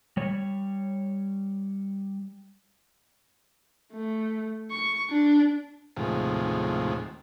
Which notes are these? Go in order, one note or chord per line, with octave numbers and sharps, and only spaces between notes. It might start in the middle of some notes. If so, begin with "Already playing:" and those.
G3 C#5
A3
C#6
D4
D#2 A2 C3 F3 G#3